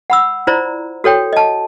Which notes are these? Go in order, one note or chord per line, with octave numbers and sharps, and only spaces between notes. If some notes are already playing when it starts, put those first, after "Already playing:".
F#5 B5 E6
E4 F4 C5 D5 A#5
F#4 A4 C#5 G5
D#5 A5